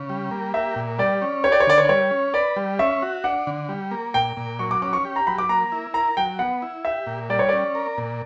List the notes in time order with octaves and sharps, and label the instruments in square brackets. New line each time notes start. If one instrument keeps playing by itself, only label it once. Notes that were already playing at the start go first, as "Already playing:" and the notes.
Already playing: [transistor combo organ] C#3
G3
A#3
[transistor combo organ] G4 [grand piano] E5
[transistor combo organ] A#2
[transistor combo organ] G3 [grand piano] D5
[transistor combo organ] C#4
[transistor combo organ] G4 [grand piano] C#5
[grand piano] D5
C#5
[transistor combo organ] D3 [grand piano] D5
[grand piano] C#5
D5
[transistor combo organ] G3 [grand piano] C#5
[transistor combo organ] C#4
[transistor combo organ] B4 [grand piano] D5
[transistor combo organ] G3
[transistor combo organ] C#4 [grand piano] E5
[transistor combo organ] F#4
[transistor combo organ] D4 [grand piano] F#5
[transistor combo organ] D3
G3
A#3
[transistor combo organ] A#2 [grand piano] G5
[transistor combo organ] A#2
[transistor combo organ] F#3 [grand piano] C#6
[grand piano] D6
[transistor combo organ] C#4 [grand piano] D6
[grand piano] C#6
[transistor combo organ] G4
[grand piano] A#5
[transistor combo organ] F#3 [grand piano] B5
[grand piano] D6
[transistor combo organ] A#3 [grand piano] A#5
[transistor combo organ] E4
[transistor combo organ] A#4 [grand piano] A#5
[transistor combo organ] F#3 [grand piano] G5
[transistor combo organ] B3 [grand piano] F#5
[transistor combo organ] E4
[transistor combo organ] G4 [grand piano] E5
[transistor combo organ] A#2
[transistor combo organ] G3 [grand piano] D5
[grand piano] C#5
[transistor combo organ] C#4 [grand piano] D5
[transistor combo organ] A#4
A#2